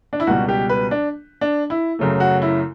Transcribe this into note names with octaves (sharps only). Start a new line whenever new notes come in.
D4
E4
C#2 B2 G3 F#4
G4
B4
D4
D4
E4
F#2 C#3 F#3 A3
F#4
E4